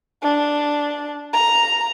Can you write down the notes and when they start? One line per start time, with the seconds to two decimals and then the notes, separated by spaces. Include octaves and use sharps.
0.23 D4
1.33 A#5